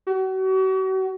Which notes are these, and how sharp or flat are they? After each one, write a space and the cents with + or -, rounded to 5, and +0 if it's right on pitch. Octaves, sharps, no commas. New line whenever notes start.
F#4 +40